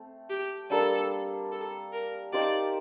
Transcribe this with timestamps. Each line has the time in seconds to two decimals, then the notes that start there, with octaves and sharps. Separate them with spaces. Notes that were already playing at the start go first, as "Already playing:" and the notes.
Already playing: A3 C4
0.30 G4
0.70 G3 A#3 D4 A4
1.52 A4
1.93 A#4
2.33 D#4 G4 C5 D5 F5